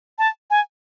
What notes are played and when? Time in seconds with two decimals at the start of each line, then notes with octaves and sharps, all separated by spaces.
0.19 A5
0.50 G#5